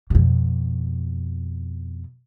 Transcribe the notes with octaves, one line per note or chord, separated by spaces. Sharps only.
F2 B2